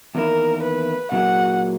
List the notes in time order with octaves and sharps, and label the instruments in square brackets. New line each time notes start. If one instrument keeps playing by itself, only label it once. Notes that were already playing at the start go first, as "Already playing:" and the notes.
[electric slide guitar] E2 D#3 A#3 E4 [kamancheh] A#4
[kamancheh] B4
[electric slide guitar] A#2 F#3 A#3 E4 G#4 [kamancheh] F#5